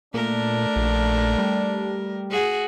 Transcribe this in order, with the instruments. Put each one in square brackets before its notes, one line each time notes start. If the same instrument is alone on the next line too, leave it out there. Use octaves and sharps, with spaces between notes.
[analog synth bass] A#2 [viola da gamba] A3 A#4 [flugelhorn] D4
[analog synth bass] A#1
G3
[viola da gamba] F#4 G#4